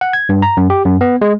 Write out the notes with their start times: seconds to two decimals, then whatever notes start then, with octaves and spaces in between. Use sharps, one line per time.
0.01 F#5
0.13 G#6
0.29 G2
0.42 A#5
0.57 F#2
0.70 G4
0.85 F#2
1.01 B3
1.21 G#3